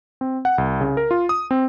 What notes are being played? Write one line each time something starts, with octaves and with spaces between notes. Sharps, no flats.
C4
F#5
C2
C#3
A#4
F4
D#6
C4